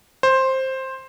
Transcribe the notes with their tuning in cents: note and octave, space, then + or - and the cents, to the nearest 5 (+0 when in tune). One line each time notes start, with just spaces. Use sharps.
C5 +10